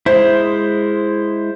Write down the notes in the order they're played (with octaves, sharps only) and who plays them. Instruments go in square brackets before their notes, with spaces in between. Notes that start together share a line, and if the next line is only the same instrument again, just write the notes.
[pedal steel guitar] G#3 E4 [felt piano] C5